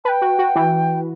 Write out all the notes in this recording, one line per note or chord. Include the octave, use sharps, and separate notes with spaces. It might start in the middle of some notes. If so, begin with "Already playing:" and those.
B4 G5 A5
F#4
F#4
E3